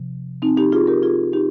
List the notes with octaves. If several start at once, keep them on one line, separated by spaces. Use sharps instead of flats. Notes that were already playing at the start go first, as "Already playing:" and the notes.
Already playing: C3 F3
C4 D#4
D#4 G4
F4 G#4
G4 A#4
F4 G#4
D#4 G4